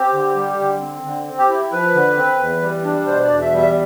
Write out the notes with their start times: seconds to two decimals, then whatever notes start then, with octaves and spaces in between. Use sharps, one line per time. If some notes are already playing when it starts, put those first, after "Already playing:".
Already playing: C4 G4
0.13 D3
0.35 G3
0.59 D3
0.81 C4
1.04 D3
1.26 C4
1.38 G4
1.49 E4
1.72 F3 B4
1.94 D3
2.17 C4
2.40 E2
2.62 G3
2.84 D4
3.07 B2 C5
3.24 D5
3.30 E2
3.41 E5
3.52 G3
3.58 E5